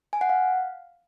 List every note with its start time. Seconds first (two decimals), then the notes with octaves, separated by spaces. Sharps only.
0.13 G#5
0.21 F#5
0.29 F5